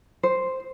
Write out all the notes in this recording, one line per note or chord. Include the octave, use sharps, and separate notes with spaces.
C5